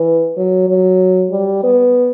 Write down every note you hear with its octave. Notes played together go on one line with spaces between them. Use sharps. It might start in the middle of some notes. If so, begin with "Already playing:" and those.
Already playing: E3
F#3
F#3
G3
B3